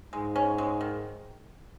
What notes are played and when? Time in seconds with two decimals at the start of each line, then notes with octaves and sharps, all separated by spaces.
0.13 G#2 G#3
0.36 C#4
0.58 G#3
0.81 D#3